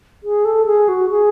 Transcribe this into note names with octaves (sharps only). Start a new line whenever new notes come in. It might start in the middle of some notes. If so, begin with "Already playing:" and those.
G#4
A4
G#4
F#4
G#4